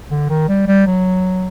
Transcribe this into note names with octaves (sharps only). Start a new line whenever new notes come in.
D3
D#3
G3
G3
F#3